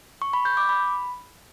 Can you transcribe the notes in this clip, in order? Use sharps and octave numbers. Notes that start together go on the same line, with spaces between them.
C#6
B5
G6
D6
B5